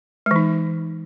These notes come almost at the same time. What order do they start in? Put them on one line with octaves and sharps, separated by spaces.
G#3 E3 D#4